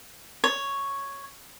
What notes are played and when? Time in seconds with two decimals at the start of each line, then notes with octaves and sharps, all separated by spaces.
0.44 C#5